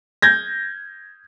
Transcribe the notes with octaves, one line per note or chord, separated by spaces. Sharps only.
G6 G#6 A#6